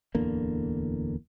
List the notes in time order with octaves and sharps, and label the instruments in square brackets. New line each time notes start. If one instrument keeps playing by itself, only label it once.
[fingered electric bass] D1 E2 D3 A#3